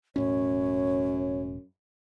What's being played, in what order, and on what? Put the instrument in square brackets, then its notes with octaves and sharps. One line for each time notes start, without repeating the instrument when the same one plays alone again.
[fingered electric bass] E1 A2 C#4 [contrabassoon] F#2 [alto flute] C#5